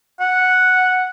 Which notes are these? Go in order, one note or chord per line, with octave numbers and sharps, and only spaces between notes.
F#5